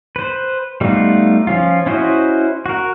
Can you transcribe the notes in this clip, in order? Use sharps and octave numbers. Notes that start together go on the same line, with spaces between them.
B4 C5
G3 A3 B3 D#4 F4
F3 C#4 F4
C#4 E4 F#4 C5 D#5
F#4 A#4